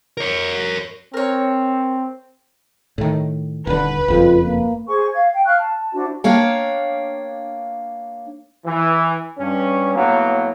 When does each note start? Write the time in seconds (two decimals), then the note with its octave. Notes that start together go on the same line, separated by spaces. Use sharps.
0.17 A#4 C#5
1.14 C4 A#4 C#5
2.98 A2 D#3
3.67 D#1 D3 B4
4.08 F#1 F2 F4
4.43 A#3
4.87 G#4 C5 G#5 C#6
5.13 F5 G#6
5.34 G5
5.46 F5 C#6 F6 F#6
5.58 A5
5.94 D4 E4 F#4 C5
6.24 A#3 D4 C#5 F5 G5
8.66 E3
9.39 G2 C#4
9.95 A2 F#3 A#3 B3